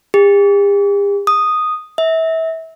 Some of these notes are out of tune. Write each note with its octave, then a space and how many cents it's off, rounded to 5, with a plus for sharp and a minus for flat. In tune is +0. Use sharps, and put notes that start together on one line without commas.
G4 +45
D#6 -5
E5 -30